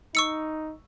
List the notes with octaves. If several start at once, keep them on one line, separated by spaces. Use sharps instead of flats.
D#4 C#6 E6 C#7